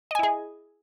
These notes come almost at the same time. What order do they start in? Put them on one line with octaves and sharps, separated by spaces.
D#5 G#5 E4 G#4